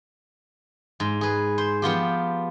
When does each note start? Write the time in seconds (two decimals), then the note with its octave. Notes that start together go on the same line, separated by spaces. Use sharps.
1.00 G#2
1.21 G#4 B4
1.58 C5
1.82 F3 B3 F4 G4